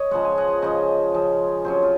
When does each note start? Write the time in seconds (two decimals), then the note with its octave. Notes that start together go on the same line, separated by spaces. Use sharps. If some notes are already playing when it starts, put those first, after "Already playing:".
Already playing: C#5 D#5
0.11 C#3 F3 G#3 F#5
0.25 G#5
0.38 D#5 F#5
0.62 C#3 F3 G#3 C5 D#5
1.14 C#3 F3 G#3
1.64 C3 F#3 C#4 G#4 C5
1.82 F4